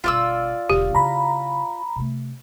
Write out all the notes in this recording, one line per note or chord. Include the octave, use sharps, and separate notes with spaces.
G1 B2 F4 D5 E6
E1 D3 G4
C#3 E4 A#5 B5
C3 A3